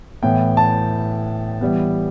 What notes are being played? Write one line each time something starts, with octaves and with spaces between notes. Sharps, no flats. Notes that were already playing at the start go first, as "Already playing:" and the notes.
A2 E3 B3 G5
A5
E3 G3 B3